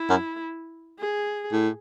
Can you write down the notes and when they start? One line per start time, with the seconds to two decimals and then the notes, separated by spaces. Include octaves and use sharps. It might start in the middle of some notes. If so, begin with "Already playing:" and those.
Already playing: E4
0.09 F#2
0.99 G#4
1.52 A2